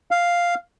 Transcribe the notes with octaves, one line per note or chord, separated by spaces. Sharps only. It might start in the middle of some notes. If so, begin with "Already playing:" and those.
F5